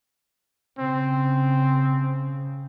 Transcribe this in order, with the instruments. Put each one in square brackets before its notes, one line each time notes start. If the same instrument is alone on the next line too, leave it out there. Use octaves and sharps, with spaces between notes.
[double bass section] C#3 [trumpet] C4